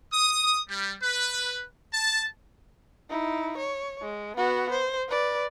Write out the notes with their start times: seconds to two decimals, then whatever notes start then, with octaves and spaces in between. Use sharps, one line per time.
0.13 D#6
0.69 G3
1.03 B4
1.93 A5
3.10 D#4 E4
3.57 C#5
4.02 G#3
4.37 B3 F#4
4.72 C5
5.08 B4 D5